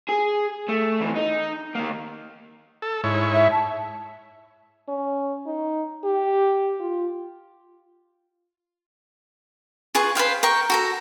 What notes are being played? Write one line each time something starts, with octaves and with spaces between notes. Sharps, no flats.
G#4
A3
F2 E3
D#4
D#3 A#3
A4
G#2 E4 C#5
E5
A5
C#4
D#4
G4
F4
F4 G#4 B4 C#6
B4 C5 F5 G5
A#4 G5 C#6
F#4 A4 A#5